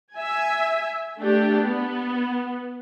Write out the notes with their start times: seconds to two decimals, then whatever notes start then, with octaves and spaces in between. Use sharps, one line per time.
0.15 E5 G#5
1.20 A3 D4 G4
1.59 B3